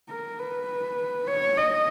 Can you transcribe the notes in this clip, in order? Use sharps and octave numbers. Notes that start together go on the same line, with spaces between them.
A#4
B4
C#5
D#5